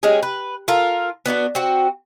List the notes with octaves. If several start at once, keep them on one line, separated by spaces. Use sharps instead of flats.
G#3 C#4 G4 G#4
B4
F4 A4 A#4
B3 D4 D#4 F#4
C4 F#4